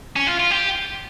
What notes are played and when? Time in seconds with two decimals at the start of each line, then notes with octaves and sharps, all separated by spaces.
0.16 C#4
0.27 F4
0.40 F4
0.51 G4